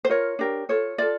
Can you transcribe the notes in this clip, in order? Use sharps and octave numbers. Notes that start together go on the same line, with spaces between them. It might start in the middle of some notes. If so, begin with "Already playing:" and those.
C5
F4 A#4 C#5
D4 G4 A#4
F4 A4 C#5
F4 A4 D5